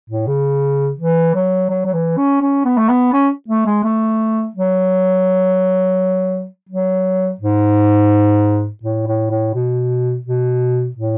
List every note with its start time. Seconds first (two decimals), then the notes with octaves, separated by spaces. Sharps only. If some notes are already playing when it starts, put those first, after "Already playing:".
0.10 A2
0.27 C#3
0.99 E3
1.35 F#3
1.70 F#3
1.85 F#3
1.93 E3
2.18 C#4
2.41 C#4
2.65 B3
2.77 A3
2.89 B3
3.13 C#4
3.48 A3
3.66 G#3
3.84 A3
4.55 F#3
6.69 F#3
7.41 G#2
8.83 A2
9.07 A2
9.31 A2
9.54 B2
10.26 B2
10.97 A2